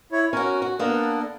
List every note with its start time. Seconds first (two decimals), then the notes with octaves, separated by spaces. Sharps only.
0.12 E4 C#5
0.33 C#4 F#4 A#4
0.62 F#4
0.79 A#3 B3 D4 A4 A#4